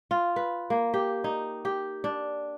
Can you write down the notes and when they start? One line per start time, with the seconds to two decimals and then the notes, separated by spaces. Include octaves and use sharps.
0.11 F4
0.36 B4
0.70 A#3
0.94 G4
1.24 D#4
1.65 G4
2.04 D4